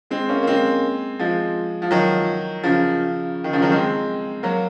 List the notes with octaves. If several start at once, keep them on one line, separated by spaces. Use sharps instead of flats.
G#3 C4
A#3 C#4
A#3
G#3 C4
F3 G#3
F3
D#3 F#3
C#3 F3
D#3
C#3 F3
D#3 F#3
G#3 C4
F#3 A#3